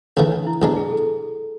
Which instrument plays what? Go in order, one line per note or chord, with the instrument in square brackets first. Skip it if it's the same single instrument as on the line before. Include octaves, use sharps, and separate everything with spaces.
[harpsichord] D2 C#3 E3 A3 [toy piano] D4
[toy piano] D4
E4
[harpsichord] B1 B2 G#3 D4 [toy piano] E4
[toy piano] G#4
A4